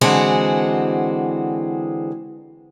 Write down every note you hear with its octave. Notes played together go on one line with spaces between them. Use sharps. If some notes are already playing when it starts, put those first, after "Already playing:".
D3 E3 G#3 C4 F#4